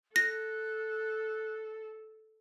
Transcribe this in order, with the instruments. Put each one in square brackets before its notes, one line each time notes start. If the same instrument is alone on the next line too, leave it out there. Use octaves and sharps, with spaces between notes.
[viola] A4 [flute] F#6 [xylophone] A#6